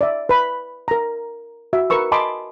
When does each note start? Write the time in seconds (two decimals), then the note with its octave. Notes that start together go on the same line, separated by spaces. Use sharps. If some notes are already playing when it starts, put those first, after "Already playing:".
0.01 D5 E5
0.29 B4 B5
0.88 A#4 A#5
1.73 F#4 E5
1.90 A#4 B4 C#6 E6
2.12 D#5 G#5 A5 B5 C6 D6